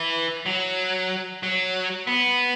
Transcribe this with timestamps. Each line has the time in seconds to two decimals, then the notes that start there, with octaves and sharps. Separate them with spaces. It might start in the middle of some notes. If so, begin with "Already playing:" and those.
Already playing: E3
0.46 F#3
1.43 F#3
2.07 B3